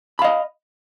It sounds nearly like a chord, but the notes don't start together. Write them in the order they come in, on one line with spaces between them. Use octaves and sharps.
B5 F5 D#5